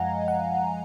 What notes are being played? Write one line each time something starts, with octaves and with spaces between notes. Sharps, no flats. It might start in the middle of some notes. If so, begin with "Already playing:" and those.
Already playing: F#2 F3 G#3 D#5 F5 F#5 G#5 A#5
F#5